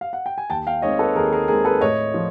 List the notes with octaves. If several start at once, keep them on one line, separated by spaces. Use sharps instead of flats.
F5
F#5
G5
G#5
D#2 G5 A5
F5 G5
D#3 G#3 C4 C#5 D#5
A4 B4
D#2 G#4 A#4
G#4 A#4
D#3 G#3 C4 G#4 A#4
A4 B4
A2 C#5 D#5
F3